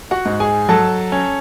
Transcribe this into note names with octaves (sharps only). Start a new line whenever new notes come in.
F#4 F#5
G#2
G#4 G#5
F#3 A4 A5
C#4